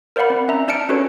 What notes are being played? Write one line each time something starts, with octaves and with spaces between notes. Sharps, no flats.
A#4 C5 D5 F5 F#5 B5
C4
C#4 E5 A#5
D4 D5 A5 F6 C#7 D7
C#4 D4 F#4 A4 B4 C#5